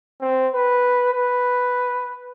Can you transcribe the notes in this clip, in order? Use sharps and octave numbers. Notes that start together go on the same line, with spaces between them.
C4
B4
B4